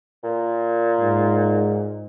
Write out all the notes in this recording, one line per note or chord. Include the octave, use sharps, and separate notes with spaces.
A#2
G#2